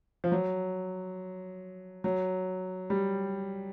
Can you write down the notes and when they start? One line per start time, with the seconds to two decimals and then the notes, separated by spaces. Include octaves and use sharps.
0.24 F3
0.32 F#3
2.04 F#3
2.90 G3